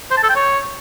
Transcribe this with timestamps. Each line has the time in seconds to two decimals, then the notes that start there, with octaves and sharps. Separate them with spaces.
0.11 C5
0.17 A5
0.23 A4
0.29 G5
0.36 C#5